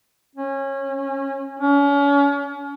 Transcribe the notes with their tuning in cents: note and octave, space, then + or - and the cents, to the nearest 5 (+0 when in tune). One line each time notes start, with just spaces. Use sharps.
C#4 -25
C#4 +35